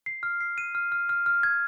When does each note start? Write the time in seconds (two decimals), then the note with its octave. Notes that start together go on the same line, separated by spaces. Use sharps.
0.06 C7
0.23 F6
0.41 C7
0.58 D#7
0.75 F6
0.92 F6
1.09 F6
1.26 F6
1.43 G#6